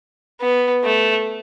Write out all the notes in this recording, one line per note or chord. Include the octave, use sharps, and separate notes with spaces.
B3
A3